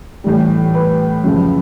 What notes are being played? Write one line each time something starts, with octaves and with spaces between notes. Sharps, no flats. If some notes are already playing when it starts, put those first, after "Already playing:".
A2 E3 G3
B4
F#2 C#3 F3